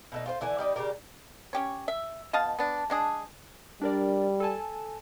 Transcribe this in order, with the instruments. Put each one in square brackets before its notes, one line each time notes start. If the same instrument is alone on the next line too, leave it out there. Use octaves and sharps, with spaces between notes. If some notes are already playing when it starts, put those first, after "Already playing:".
[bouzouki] B2 A3 D#4
F4 G4 C5
D3 E3 A3 G#5
G3 D#4 D5
C#3 D4 G4 A#4
[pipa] C#4 G4 C#5
E5
B2 D#5 F5 A5
B3 D4
G#3 D4 G#4
[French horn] G3 [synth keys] D4 A#4 D5
[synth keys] A4 G#5 A5